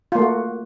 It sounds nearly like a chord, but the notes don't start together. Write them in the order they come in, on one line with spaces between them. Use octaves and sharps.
F4 A#3 A3 F#4